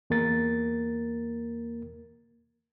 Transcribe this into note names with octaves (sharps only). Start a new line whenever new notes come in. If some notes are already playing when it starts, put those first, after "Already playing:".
E2 A#3 A#4 A6